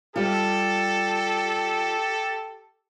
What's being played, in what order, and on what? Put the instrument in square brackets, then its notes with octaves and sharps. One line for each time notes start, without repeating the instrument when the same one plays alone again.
[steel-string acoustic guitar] G3 F4 [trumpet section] G4 A4